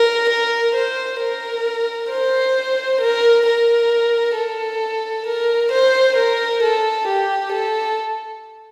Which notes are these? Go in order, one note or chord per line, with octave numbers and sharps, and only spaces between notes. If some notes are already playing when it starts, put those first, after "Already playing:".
Already playing: A#4
A#4
C5
A#4
C5
A#4
A#4
A4
A#4
C5
A#4
A4
G4
A4